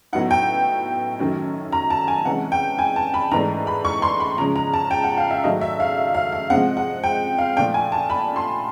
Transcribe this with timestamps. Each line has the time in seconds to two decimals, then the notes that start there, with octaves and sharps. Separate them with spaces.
0.13 A2 F#3 B3 D#4 F#5
0.31 G5
1.19 F#2 D#3 F#3 A3 C#4
1.72 A#5
1.90 A5
2.08 G#5
2.25 C3 E3 G#3 C#4 F#5
2.52 G5
2.78 G#5
2.96 A5
3.14 B5
3.31 G#2 E3 A3 D4 A#5
3.67 B5
3.85 C#6
4.02 C6
4.20 B5
4.38 C#3 F3 G#3 C#4 A#5
4.56 A#5
4.73 A5
4.91 G5
5.04 F#5
5.17 F5
5.31 E5
5.44 G#2 D#3 F#3 A3 D4 D#5
5.61 E5
5.80 F5
6.15 F5
6.32 F5
6.50 C3 F3 G#3 C4 F#5
6.77 F#5
7.04 G5
7.38 F5
7.57 A#2 F3 A3 D4 G5
7.74 G#5
7.92 A5
8.10 B5
8.36 C6